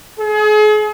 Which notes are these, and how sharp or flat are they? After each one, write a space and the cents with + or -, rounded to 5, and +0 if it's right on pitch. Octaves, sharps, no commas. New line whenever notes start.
G#4 +40